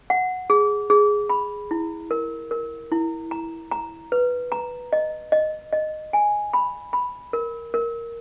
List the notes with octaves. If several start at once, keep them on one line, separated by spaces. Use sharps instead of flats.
F#5
G#4
G#4
B5
E4
A#4
A#4
E4
A#5
A#5
B4
A#5
D#5
D#5
D#5
G#5
B5
B5
A#4
A#4